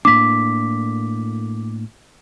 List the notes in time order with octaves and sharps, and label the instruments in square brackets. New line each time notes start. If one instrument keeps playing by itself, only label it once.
[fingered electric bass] A2 A#3 D4 [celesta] D6 B6